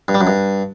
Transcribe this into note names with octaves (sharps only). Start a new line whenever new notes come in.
G2
G3
F#2
G2